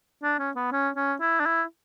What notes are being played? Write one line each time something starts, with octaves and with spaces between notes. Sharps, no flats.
D4
C#4
B3
C#4
C#4
E4
D4
E4